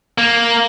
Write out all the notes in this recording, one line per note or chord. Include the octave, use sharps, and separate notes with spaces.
A#3